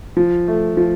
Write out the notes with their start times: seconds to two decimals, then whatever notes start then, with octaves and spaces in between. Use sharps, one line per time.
0.17 F3
0.48 A3
0.77 F3